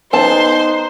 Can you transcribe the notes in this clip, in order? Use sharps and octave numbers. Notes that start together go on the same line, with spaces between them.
B3 D#4 C5 A5 C6